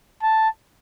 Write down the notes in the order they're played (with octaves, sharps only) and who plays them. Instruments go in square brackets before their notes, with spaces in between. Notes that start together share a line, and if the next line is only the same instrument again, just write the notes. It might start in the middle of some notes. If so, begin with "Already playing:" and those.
[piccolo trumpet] A5